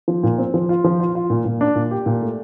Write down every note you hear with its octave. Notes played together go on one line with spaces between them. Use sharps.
F3
A#2
C4
F3
F4
F3
F4
F4
A#2
A#2
D4
A#2
G4
A#2
A3